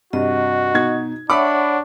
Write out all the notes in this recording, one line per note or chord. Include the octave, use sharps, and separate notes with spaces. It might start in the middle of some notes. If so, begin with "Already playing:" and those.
G2 C3 F#4 D#5
B2 D#4 G#6
D4 C#5 E5 F#5 B5 C#6 D6